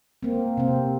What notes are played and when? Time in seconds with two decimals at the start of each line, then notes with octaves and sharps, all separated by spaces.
0.23 A#3 C4
0.57 C3 C4